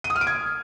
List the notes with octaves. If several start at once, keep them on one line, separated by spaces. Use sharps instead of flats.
D#7
D#6
F6
D7
G#6